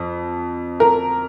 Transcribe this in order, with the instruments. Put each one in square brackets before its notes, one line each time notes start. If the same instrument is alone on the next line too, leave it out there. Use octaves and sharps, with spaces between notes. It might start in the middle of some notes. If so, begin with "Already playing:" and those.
Already playing: [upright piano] F2
A#4